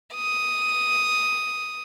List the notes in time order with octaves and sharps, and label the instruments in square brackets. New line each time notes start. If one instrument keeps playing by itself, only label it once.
[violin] D#6